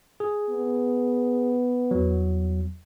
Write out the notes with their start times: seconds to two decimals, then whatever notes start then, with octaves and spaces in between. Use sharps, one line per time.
0.20 G#4
0.50 B3
1.91 E2 F#3